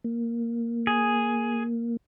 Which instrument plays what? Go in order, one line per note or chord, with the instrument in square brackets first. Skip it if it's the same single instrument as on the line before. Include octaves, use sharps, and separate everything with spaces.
[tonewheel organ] A#3
[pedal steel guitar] G#4